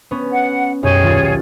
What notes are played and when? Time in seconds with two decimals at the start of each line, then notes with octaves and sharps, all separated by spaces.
0.11 B3 C#4
0.33 F#5
0.83 B1 F#2 G4 G#4 C#5
1.03 D#1 F4 A6